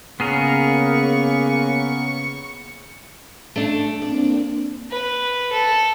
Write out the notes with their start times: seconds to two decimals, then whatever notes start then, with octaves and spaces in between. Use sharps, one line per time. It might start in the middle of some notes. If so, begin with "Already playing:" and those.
0.20 C#3 A#3 B3 G#4 A#4 C#6
3.56 A3 D4
4.02 A#3 C4 D4 D5
4.91 B4
5.52 A4